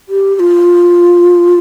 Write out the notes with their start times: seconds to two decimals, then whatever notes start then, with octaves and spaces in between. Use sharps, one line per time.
0.09 G4
0.36 G4
0.40 F4